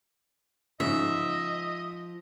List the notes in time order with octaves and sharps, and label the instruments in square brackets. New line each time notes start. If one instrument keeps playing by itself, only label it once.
[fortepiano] G#2 C#3 [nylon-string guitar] F3 [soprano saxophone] D#5 [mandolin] E5